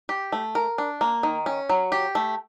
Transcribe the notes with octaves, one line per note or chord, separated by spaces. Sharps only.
G4
A3
A#4
D4
A#3
D#3
C#4
F#3
G4
A3